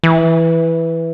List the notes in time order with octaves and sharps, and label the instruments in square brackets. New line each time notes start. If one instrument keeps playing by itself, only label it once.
[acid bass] E3